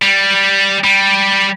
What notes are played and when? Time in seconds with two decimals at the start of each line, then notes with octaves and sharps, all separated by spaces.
0.02 G3
0.84 G3